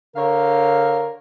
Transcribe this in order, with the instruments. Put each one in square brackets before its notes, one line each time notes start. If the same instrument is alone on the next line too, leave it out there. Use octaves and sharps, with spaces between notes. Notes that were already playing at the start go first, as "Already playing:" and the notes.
[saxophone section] D3 C#5 F5 [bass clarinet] A#4